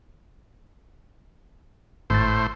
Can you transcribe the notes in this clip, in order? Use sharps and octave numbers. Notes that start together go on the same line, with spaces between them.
G#1 A2 C5 A6